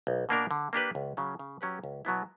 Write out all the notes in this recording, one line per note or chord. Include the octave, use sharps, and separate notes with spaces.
B1
B2 A#3 D4 A#4
D3
A#3 D4 G4 B4
C#2
C#3 F#3 C#4
C#3
F#3 C#4 G4 B4
C#2
B2 F#3 B3 E4